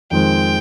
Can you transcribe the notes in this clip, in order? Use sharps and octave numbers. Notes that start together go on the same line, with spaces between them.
F2 D#3 G#3 C4 G5